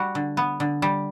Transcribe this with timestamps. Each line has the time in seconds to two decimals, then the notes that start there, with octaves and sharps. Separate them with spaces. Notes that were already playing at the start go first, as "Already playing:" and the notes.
Already playing: G3 F#4
0.15 D3
0.37 B3
0.60 D3
0.82 G3